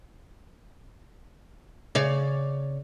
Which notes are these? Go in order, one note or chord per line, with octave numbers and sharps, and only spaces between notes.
C#3 C#5 D5